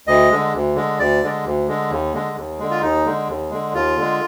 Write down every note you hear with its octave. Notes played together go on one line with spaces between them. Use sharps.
D2 D#5
D3 G#3
D2
D3 G#3
D2 D5
D3 G#3
D2
D3 G#3
D#2
D3 G#3
D#2
D3 G#3
F4
D#2 D#4
D3 G#3
D#2
D3 G#3
D#2 F4
D3 G#3